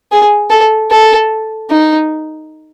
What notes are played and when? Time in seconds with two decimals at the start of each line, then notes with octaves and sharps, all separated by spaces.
0.12 G#4
0.50 A4
0.90 A4
1.71 D#4